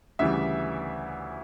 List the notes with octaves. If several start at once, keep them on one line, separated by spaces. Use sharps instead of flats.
D2 C#3 E3 G3 E5